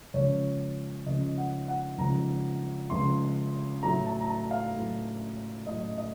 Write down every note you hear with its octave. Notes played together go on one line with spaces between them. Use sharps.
C#2 C#3 F3 C#5
C#2 C#3 F3 D#5
F#5
F#5
C#2 C#3 F3 A#5
C#2 C#3 F3 C6
A2 F#3 A#5
A5
A#5
A5
F5
A2 F#3
A2 F#3 D#5
D#5